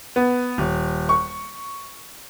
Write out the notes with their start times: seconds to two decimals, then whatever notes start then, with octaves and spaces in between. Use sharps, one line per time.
0.16 B3
0.58 D#1
1.09 C#6